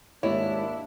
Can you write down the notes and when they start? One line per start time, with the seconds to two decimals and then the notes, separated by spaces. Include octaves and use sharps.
0.23 D#2 G#2 A#3 D4 E4 C#5 D#5